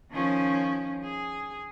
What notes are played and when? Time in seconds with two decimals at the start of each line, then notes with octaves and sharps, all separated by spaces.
0.11 D#3 F3 C#4
1.03 G#4